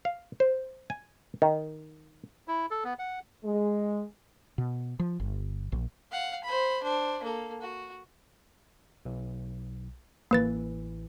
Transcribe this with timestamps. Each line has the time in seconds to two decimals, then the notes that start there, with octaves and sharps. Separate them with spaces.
0.05 F5
0.40 C5
0.90 G#5
1.42 D#3
2.48 E4
2.71 A4
2.84 B3
2.99 F#5
3.44 G#3
4.58 B2
4.99 F3
5.20 G1
5.72 A#1
6.12 F5 F#5
6.44 C5 B5
6.83 D4 C5
7.23 A#3 A4
7.61 F#4
9.05 B1
10.31 A1 E3 A#3 B4 A6